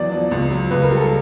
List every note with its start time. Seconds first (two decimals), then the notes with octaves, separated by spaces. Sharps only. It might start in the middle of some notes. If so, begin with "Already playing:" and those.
Already playing: E2 F#3 D5
0.12 F3
0.31 C#2
0.51 F#3
0.71 C#2 B4
0.84 A#4
0.91 G3
0.97 A4